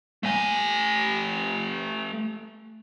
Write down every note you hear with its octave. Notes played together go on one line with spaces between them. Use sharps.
A3 G#5